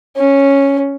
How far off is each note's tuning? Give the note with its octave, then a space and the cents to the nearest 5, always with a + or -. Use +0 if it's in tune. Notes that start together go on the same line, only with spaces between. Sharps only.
C#4 -5